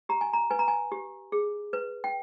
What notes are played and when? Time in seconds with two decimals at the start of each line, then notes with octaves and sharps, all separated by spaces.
0.09 G4 A#5
0.21 G#5
0.33 A#5
0.51 B4 G#5
0.59 A#5
0.68 G#5
0.92 G4
1.32 G#4
1.73 B4
2.04 G5